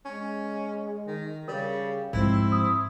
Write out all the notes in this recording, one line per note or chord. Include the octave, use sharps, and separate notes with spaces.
G#3 C#4
D#3
C#3 G3 A#4
G#2 F3 C4 E4
D#6